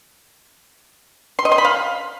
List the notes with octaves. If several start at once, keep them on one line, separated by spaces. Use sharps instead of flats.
C6
D#5
C6
B5
F5